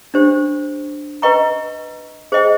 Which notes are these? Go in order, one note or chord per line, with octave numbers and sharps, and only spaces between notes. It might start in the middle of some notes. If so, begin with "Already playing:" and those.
D4 G4 C5
B4 D#5 G5 A#5 C#6
G#4 C5 D#5 G5